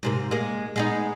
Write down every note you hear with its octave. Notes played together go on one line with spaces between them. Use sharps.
G#2 C3 A#3
G#3 A#3
G#3 B3 D#4